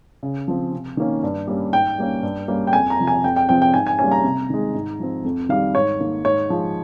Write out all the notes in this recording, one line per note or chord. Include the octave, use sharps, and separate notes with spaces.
C#3
F3 C4
C3
D#3 A#3 C#4
G2
G3 A#3 C#4
G#2 G5
G3 A#3 C#4
G2
G3 A#3 C#4
G5
F2 G#5
A#5
C3 F3
G#5
F2 G5
G5
C3 F3 C4 G5
G5
G#2 G#5
G#5
G3 A#3 C#4 G#5
A#5
C3
D#3 G#3
G#2
F3 C4
F2
D#3 G3 F5
G#2 C#5
D#3 A#3
G#2 C#5
F3 G#3